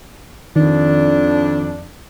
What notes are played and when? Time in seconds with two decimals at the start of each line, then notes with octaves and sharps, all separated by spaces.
0.56 F2 D#3 D4